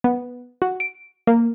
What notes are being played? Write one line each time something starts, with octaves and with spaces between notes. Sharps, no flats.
B3
F#4
D7
A#3